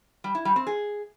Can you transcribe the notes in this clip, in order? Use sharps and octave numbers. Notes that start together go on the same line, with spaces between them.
G3
E4
G3
C4
G#4